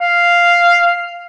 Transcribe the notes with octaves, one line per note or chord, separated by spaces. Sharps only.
F5